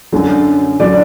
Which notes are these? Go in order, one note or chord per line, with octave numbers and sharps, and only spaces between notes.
F#2 D3 F#3
D3 F#3 D5